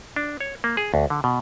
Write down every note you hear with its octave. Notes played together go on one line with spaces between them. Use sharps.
D4
C#5
A#3
G#4
D2
D3
B2